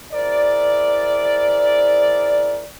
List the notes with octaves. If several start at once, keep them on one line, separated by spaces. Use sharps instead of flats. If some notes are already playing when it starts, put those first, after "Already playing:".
E4 G#4 A#4 C5 D5